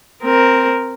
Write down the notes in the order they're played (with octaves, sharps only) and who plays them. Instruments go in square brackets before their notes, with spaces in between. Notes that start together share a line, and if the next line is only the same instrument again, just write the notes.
[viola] C4 A#4